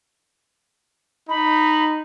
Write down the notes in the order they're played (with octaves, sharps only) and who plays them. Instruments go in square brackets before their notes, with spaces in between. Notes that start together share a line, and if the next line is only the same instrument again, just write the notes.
[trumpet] D#4 [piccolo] B5